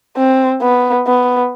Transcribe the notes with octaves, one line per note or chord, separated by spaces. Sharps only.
C4
B3
B3